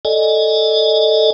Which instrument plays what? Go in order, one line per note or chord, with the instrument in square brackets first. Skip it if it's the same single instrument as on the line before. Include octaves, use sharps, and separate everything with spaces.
[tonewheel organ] A4 D5 D#5 G#5